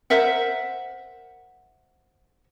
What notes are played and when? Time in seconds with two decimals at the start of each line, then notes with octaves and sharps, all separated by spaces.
0.10 A#4 C5 E5 F#5